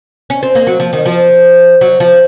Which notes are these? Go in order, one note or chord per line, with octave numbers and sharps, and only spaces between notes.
C#4
C4
A#3
F#3
F3
D#3
F3
F#3
F3